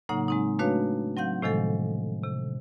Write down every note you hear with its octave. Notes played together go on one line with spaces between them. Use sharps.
A2 C#3 F#3 A#3 D#4 F#5
G#3 C4 D#4
A3 D4 F#4 B4 C#5 F5
F#3 C4 F5 F#5 G6
A2 C3 D#3 F3 G#3 A4
C3